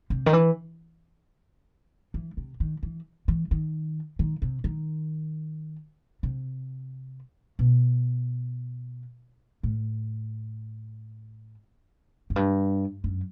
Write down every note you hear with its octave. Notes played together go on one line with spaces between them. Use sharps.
C3
D#3
E3
E3
C3
D#3
E3
E3
D#3
D#3
C3
D#3
C3
B2
A2
F#2
G2
F#2